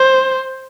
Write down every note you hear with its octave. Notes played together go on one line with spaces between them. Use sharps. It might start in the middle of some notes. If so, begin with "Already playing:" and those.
Already playing: C5